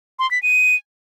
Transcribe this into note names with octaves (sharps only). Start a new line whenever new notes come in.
C6
B6
D#7